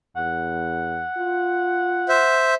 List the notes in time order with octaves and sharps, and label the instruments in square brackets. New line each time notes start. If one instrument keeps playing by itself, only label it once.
[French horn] E2 [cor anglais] F#5
[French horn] F4
[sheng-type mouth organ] C5 E5